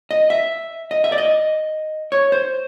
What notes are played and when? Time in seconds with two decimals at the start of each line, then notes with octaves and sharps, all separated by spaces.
0.11 D#5
0.30 E5
0.91 D#5
1.04 E5
1.12 D5
1.18 D#5
2.12 C#5
2.32 C5